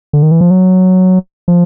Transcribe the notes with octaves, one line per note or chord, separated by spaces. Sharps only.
D3
D#3
E3
F3
F#3
F3